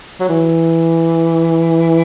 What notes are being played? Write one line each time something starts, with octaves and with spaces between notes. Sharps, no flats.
F#3
E3